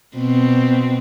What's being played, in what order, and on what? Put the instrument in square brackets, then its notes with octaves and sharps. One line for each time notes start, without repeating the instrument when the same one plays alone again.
[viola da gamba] B2 C4